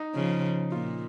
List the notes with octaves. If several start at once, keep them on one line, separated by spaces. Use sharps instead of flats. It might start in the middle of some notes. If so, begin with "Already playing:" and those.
Already playing: D#4
C#3 F3
A#2 F4